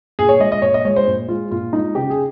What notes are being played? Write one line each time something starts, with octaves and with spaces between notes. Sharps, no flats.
A#2 G#4
C#5
G#3 D#5
D#5
A#2 C#5
D#5
G#3 C#5
C5
A#2
G#3 F4
A#2 F4
G#3 D#4
C#3 G4
G#4